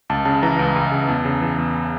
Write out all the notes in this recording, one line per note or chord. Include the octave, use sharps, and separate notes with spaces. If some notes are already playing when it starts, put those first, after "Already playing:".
C#2 A5
C#3 A5
E3 A#5
C#2
C#2
C#3
E2 A5
C#3
E3
E2